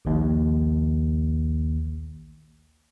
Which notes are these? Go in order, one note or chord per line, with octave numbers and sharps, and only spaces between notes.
A#1 D#2